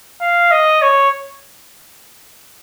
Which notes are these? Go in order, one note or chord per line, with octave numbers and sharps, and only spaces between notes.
F5
D#5
C#5